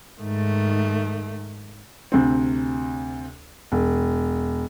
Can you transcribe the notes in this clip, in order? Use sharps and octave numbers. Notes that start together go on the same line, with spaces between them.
G#2 D#3 A3
D2 C3 C4
E1